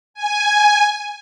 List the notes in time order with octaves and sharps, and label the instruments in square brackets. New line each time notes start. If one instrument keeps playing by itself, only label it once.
[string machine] G#5